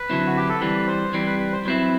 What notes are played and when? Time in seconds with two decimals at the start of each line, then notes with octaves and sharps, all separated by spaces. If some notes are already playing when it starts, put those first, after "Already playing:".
Already playing: B4
0.09 D3 F#3 C4 E4
0.27 F#4
0.37 G4
0.49 A4
0.61 E3 G3 C4 B4
0.87 C5
1.13 E3 G3 C4 B4
1.26 B4
1.40 B4
1.53 C5
1.65 F#3 C4 E4 B4